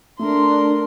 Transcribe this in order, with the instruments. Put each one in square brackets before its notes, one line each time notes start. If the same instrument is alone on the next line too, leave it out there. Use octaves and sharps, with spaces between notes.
[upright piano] A3 [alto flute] D4 [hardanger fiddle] A#4 C6